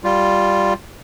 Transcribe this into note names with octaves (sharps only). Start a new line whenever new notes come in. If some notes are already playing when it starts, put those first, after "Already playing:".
G3 F4